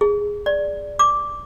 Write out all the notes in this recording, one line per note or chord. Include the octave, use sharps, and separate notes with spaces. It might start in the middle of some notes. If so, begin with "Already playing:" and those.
G#4
D5
D6